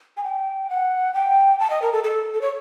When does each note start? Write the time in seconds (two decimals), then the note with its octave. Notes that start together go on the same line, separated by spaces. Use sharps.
0.17 G#5
0.24 G5
0.70 F#5
1.14 G5
1.60 A5
1.70 D#5
1.82 A#4
1.93 A4
2.04 A4
2.34 A4
2.41 C#5